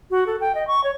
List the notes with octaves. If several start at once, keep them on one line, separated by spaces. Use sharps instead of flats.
F#4
A4
G5
D#5
C#6
C#5